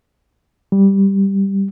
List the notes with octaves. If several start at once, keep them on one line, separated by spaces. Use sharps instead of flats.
G3